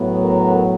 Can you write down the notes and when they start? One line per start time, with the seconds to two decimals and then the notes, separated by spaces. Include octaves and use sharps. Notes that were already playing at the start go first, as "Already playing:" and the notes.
Already playing: A2 F#3 B3
0.23 A#4